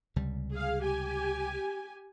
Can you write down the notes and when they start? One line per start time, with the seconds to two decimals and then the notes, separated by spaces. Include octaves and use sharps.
0.16 C#2 C3 G3
0.53 G#4 F5
0.81 G4 G#5